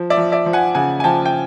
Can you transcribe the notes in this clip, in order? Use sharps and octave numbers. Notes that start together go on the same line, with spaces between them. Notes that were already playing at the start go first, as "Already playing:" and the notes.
Already playing: F3
D5 E5
F3
D5 E5
F3
F#5 G#5
C#3 F#5 G#5
G#5
F3 G5 A5
G5